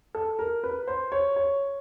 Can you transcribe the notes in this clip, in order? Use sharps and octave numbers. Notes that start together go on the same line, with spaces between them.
A4
A#4
B4
C5
C#5
C#5